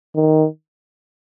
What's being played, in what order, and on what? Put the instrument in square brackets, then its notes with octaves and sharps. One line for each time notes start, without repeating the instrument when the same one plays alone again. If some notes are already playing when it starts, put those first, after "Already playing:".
[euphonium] D#3